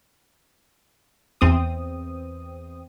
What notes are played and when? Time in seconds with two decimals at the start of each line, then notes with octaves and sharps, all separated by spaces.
1.41 E2 C4 D#6